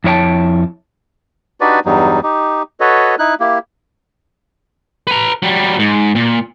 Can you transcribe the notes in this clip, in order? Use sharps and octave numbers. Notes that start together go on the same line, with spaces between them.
F2 E4 C#5 G5 A5
D4 D#4 F#4 G4 B4 D5
E2 G2 F#3 G3 D#4
D#4 G4
F#4 A4 B4 C#5 D#5
D#4 E4 F#6
A#3 E4 G4
B4 A#5
F#3 G3
G#2
A#2